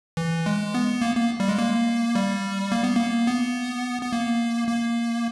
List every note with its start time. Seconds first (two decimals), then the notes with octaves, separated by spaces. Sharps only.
0.17 E3
0.46 G#3
0.74 B3
1.02 A#3
1.16 A#3
1.40 G3
1.48 G#3
1.58 A#3
2.15 G3
2.72 A#3
2.83 B3
2.97 A#3
3.27 B3
4.02 B3
4.12 A#3
4.68 A#3